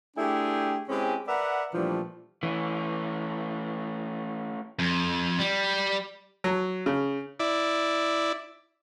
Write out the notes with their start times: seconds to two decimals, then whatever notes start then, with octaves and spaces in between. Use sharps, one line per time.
0.17 A3 D4 E4 G4 G#4 G5
0.89 G#3 C4 C#4 E4 G4 G#4
1.28 A#4 B4 D5 E5 F#5
1.73 A#2 E3 F3 G3 A3 D4
2.43 E3 A3 C#4
4.79 F2
5.39 G3
6.44 F#3
6.86 C#3
7.40 E4 D5